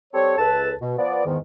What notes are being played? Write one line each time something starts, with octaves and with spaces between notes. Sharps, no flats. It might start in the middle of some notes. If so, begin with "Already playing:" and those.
G3 C4 G4 A4 C#5
C#2 A4 B4 A5
B2
F3 B3 D5
E2 G#2 D#3 B3